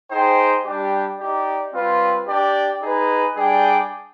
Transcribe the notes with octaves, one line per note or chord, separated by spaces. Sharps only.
D#4 G#4 C5 G5
G3 D4 G4
D#4 G4 D5
G3 C4 F4 B4
D4 G4 D5 G5
D#4 G#4 B4
G3 D4 G#4 D5 G5